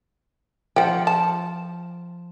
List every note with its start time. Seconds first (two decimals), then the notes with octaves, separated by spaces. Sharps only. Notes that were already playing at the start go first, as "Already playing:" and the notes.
0.76 F3 F#5 G5
1.07 A5